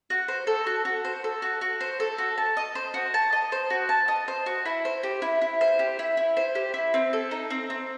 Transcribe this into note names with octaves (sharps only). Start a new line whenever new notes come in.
F#4
C5
A4
F#4
F#4
C5
A4
F#4
F#4
C5
A4
F#4
A5
D#5
C5
F#4
A5
D#5
C5
F#4
A5
D#5
C5
F#4
E4
C5
G4
E4
E4
C5
G4
E4
E4
C5
G4
E4
C4
A4
D#4
C4
C4